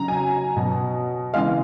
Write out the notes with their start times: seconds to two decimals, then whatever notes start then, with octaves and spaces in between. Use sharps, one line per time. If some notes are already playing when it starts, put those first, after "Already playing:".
Already playing: C#3 F#3 A#5
0.08 G#5
0.56 B2 F#3
1.34 C#3 E3 G#3 F5